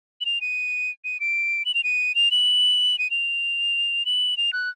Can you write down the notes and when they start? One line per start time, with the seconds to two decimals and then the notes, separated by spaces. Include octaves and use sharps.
0.21 F#7
0.26 F7
0.41 D#7
1.04 D#7
1.20 D7
1.65 F#7
1.74 F7
1.84 D#7
2.15 F7
2.31 F#7
2.99 D#7
3.11 F7
4.05 F#7
4.37 F7
4.53 F#6